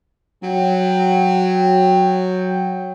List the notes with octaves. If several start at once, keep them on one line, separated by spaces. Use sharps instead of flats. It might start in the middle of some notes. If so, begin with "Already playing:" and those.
F#3 G5